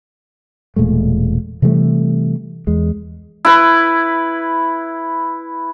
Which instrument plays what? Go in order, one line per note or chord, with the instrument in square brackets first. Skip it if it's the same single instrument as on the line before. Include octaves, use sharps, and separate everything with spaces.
[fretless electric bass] E1 A#2 G#3 A3
C3 E3 G3 A3
E2 G#3
[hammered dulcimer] E4 B4